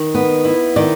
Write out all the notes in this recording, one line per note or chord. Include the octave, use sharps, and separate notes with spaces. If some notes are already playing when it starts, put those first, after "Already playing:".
Already playing: D#3
B3
E4
D#3 D5